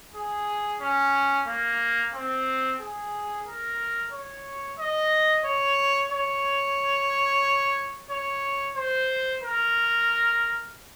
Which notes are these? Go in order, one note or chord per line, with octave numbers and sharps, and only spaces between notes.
G#4
C#4
A#3
C4
G#4
A#4
C#5
D#5
C#5
C#5
C#5
C5
A#4